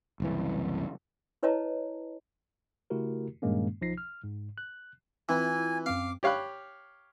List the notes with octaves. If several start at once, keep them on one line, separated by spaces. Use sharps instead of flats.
F#1 C2 E3
E4 B4 C#5 D#5 A5 A#5
C#3 A3 E4 F#4 G4 A#4
G2 A#2 D#3 G#3 A#3 C#4
B1 F3 D#4 A#6 C7
F6
G#2
F#6
E3 C4 E4 F4 G#5
F#2 C4 F5 D6
G4 C#5 F5 B5 F#6